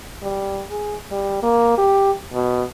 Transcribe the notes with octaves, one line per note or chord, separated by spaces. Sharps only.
G3
G#4
G3
A#3
G4
B2